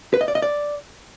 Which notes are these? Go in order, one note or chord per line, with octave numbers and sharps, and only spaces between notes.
B4
D#5
D5
D#5
D5